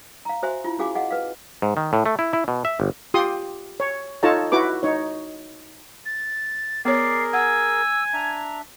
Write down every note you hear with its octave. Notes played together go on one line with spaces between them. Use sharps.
F5 A#5
F#4 C5 E5 G#5 C6
E4 F4
C#4 F#4 G#4 F5 G#5 D6
G#4 D#5 F5 F#5
B4 F5
G#2
D#3
A2
A3
E4
E4
B2
E5
G1
F4 G4 C6 D#6
C#5
D#4 F4 A4 C#5 A5 A#5
E4 F#4 B4 D6
D#4 C#5
A6
B3 G#4 A#4 C#5 D5 C7
F#5 G#5 E6
D4 E5 A#5